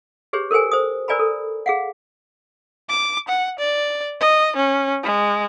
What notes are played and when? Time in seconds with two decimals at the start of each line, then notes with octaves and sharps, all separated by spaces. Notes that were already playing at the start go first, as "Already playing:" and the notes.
0.33 G4 G#4 B4 C#5
0.51 A4 A#4 C5 G5 G#5
0.71 C5 D#6
1.08 A#4 B4 D5 G#5 A#5 B5
1.19 A4
1.66 G#4 F5 F#5
2.89 D6
3.28 F#5
3.59 D5
4.20 D#5
4.57 C#4
5.03 G#3